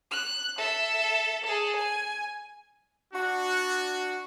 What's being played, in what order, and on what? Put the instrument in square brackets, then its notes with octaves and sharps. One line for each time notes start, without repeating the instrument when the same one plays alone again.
[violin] F#6
A4 E5
G#4 A4
G#5
[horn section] D4 F#4